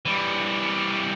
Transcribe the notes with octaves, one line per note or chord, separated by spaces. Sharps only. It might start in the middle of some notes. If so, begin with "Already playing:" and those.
E3 G3